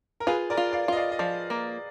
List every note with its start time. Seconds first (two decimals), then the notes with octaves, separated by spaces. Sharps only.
0.20 A#4
0.27 F4 G#4 B4
0.50 A#4 D5
0.57 F4
0.73 D5 F5
0.88 F4 D#5
0.96 D5 F5
1.12 D#5
1.19 F3 D5 F5
1.50 A#3